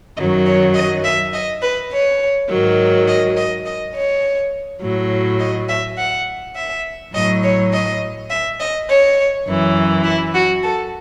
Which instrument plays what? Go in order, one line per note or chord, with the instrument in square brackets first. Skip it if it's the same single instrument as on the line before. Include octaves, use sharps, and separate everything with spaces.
[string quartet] F#2 D#3 F#3 D#5
C#5
D#5
E5
D#5
B4
C#5
G#2 D#3 F#3
D#5
D#5
D#5
C#5
A2 F#3
D#5
E5
F#5
E5
A2 F#3 D#5
C#5
D#5
E5
D#5
C#5
F#2 E3
E4
F#4
A4